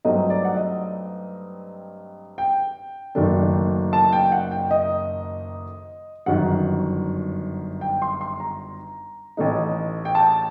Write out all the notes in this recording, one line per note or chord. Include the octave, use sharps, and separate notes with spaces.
G2 F#3 A3 C4 D#4 D#5
D5
F#5
D#5
G5
F#1 F#2 D#3 A3 D4
A5
G5
F#5
G5
D#5
G1 F#2 D#3 F#5
G5
C6
C6
A#5
A1 A2 A3 D#4
G5
A5